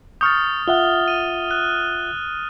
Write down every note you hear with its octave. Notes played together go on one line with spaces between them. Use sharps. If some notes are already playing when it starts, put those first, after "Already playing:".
C#6 D#6 F6 G6 A6
F4 E5 F#5 G7
D#7
F#6